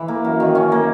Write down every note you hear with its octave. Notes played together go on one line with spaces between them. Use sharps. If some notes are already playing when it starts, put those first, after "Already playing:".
Already playing: E3
A#3
F#2
D#3
C#4
A#3